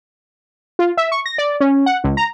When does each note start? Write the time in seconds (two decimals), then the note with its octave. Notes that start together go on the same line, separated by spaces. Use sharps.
0.79 F4
0.97 E5
1.12 C#6
1.26 A#6
1.38 D5
1.60 C#4
1.86 F#5
2.04 C#2
2.17 A#5